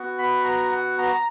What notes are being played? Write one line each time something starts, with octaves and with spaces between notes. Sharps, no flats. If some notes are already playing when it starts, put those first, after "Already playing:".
Already playing: B3 F#4
B5
A#5
F#5
A#5